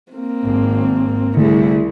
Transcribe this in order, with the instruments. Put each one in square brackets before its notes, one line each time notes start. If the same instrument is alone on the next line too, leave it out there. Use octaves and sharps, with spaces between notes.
[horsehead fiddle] A#3 C4
[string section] G#1
[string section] C2 [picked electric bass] D3 A3 [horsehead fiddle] E4 G#4